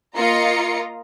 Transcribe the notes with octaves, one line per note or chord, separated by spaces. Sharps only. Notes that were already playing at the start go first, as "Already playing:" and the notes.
A#3 F4 D#5 A#5 C#7